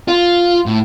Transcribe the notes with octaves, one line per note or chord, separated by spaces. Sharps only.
F4
A2